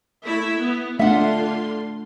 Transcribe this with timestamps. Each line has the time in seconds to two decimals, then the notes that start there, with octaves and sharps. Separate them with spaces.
0.24 A3 E4 E5
0.60 B3
0.99 D3 A3 D4 F4 E5 F#5 C6